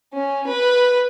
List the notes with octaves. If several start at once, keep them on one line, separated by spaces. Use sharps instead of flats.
C#4
B4